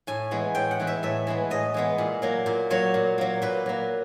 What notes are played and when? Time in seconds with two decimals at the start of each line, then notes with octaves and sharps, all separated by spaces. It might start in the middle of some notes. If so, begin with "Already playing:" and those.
0.07 A2 G#5
0.31 E3 G#3 B3
0.55 A2 G5
0.71 F#5
0.80 E3 G#3 B3
0.87 E5
1.03 A2 E5
1.27 E3 G#3 B3
1.50 A2 D#5
1.74 E3 G#3 B3
1.98 A#2
2.22 F#3 A#3
2.46 A#2
2.70 F#3 A#3 C#5
2.94 A#2
3.18 F#3 A#3
3.42 A#2 B4
3.66 F#3 A#3